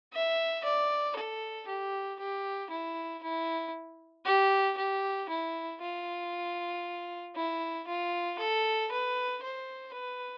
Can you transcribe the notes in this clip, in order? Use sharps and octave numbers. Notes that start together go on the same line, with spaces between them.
E5
D5
A4
G4
G4
E4
E4
G4
G4
E4
F4
E4
F4
A4
B4
C5
B4